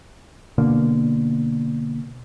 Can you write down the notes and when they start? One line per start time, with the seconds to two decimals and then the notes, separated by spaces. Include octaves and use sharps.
0.58 B2 D3 A#3